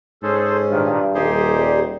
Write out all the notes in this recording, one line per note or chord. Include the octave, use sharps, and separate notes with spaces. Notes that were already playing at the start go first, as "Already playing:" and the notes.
G#2 C#4 G#4 A4 C5
G2 A#2 D#3
D#1 D#4 G4 G#4 C5
G3